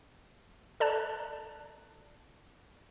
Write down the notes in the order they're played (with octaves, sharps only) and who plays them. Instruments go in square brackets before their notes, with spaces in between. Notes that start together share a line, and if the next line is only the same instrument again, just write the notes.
[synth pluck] A4 D5 A5 A#5 F#6